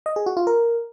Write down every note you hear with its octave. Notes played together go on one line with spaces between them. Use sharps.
D#5
G#4
F#4
F4
A#4